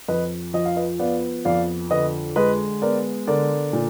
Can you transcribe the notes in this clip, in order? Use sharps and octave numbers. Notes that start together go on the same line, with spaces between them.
F2 B4 D#5
F3 D#5
F5
B4 D#5
B3 D5 F5
F2 D5 F5
D3 B4 D#5
G#3 B4 D#5
B3 A#4 D5
D3 A#4 D5
A#2